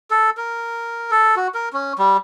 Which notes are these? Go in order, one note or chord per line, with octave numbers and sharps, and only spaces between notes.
A4
A#4
A4
F#4
A#4
C#4
G3